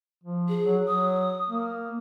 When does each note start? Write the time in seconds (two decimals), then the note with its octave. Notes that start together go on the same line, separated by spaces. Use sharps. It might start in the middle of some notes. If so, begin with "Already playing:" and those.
0.24 F3
0.49 G#4
0.65 F#3
0.87 F#3 D#6
1.50 A#3